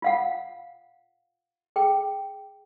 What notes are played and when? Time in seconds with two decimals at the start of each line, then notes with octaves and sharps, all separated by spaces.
0.02 F4 F5 F#5
1.76 G#4 G5